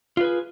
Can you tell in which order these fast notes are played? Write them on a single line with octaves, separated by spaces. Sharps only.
F4 B4 G#4